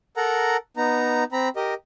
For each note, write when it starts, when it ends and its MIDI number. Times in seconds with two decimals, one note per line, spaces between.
0.17 0.57 69
0.17 0.57 70
0.17 0.57 78
0.17 0.57 82
0.77 1.24 59
0.77 1.24 63
0.77 1.24 82
1.32 1.49 60
1.32 1.49 82
1.32 1.49 83
1.56 1.74 67
1.56 1.74 70
1.56 1.74 75